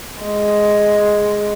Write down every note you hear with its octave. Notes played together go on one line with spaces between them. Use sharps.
G#3